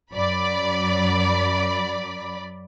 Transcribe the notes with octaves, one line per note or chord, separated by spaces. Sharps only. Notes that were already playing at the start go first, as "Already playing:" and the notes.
F#2 F#3 D5 B5